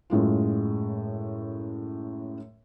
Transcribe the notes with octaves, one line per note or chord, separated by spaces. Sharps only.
F#2 A2 G#3 F4